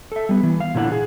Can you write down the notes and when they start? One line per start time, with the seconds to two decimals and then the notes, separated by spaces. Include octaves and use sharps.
0.12 A4 E5
0.29 G3 B3
0.43 E3
0.60 F5
0.75 A#2 D3 E4 A#4 F#5
0.92 G#4